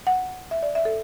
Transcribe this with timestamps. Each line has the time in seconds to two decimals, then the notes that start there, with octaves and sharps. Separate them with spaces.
0.07 F#5
0.51 E5
0.62 D5
0.75 E5
0.85 A4